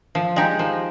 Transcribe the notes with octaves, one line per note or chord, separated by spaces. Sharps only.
F3
G#3 D#4 G4
F3